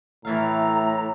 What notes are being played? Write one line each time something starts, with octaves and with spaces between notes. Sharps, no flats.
A2 E3 A3 F5 A#5